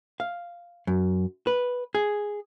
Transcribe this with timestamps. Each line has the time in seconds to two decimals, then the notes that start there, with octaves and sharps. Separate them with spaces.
0.20 F5
0.87 F#2
1.47 B4
1.95 G#4